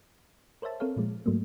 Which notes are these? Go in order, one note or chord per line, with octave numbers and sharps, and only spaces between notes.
A#4 C5 C#5 E5 A5
C4 A4 A#4 C#5 F5
A#2 F3 G#3
G#2 F#3 A3 A#3